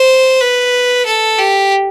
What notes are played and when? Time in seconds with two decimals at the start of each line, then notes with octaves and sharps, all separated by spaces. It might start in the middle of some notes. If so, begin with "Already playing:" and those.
Already playing: C5
0.41 B4
1.06 A4
1.38 G4